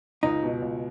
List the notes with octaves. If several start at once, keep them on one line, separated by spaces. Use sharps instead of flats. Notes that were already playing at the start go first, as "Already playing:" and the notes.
C#2 D#4
B2
C#2